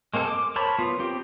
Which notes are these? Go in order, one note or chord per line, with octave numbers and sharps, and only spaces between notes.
G#3 A#3 C4 A4
D6
A#4 C5 C#5 A5 B5
B3 F4
C4 G4